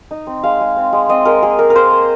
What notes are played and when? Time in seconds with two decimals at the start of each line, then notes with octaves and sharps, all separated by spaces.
0.11 D#4
0.27 C4
0.43 G#3 F5
0.61 G#3
0.77 C4
0.93 G#3
1.09 C4 D#5
1.25 G#3 A#4
1.43 A#3 G#4
1.59 A#3 A#4
1.70 A#4
1.75 A#3 C5
1.92 A#3